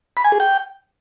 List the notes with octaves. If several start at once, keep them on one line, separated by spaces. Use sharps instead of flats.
B5
G#5
G#4
G5